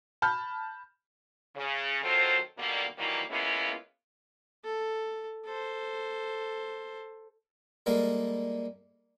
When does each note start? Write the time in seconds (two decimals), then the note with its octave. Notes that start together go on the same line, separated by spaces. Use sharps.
0.22 A5 B5 F6 G6
1.56 C#3
2.02 D#3 F#3 C4 F4 A4 C5
2.58 B2 D3 D#3 G3 A#3
2.98 D#3 E3 F#3 G3 A#3
3.30 G#3 A#3 B3 C#4 E4 F4
4.64 A4
5.45 A4 C5
7.86 G3 G#3 A#3 A4 A#4